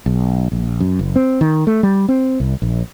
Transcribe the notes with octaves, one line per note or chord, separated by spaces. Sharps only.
B1
A#1
F#2
F#1
C4
D#3
A3
G3
C4
C2
A#1